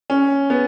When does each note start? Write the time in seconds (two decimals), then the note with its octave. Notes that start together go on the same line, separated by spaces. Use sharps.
0.10 C#4
0.50 B3